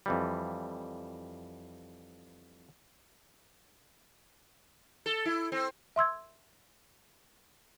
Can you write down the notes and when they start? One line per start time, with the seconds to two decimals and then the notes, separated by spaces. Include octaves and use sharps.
0.06 F2 E3 G3
5.06 A4
5.25 E4
5.52 C4
5.96 E5 C6 E6 G#6